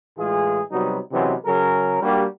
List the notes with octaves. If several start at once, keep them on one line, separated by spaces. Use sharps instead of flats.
A2 E3 G#3 F4 G#4
C3 F#3 G3 B3 D#4 F#4
C3 E3 F#3 G#3 B3 C#4
C#3 F#3 G#4 A#4
G3 A#3 D4 F#4 G4